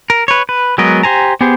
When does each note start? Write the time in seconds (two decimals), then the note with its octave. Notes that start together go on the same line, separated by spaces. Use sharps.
0.10 A#4
0.28 B4 C#5
0.49 B4
0.78 F#3 G#3 B3 A#4 D#5
1.03 G4 C5 G#5 A#5
1.41 B3 G4 G#4 C5